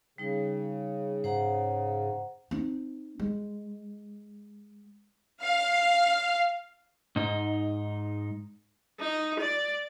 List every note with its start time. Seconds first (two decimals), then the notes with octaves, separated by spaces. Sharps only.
0.18 C#3 G3 D#4
1.24 G#2 C5 F#5 A#5
2.51 C4 D#4
3.20 G#3
5.42 F5
7.16 G#2 D#4
9.00 D#4
9.40 D5